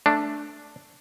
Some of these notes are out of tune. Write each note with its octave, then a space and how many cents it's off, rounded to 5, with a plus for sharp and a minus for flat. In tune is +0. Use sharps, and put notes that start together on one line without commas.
A3 +0 D4 +0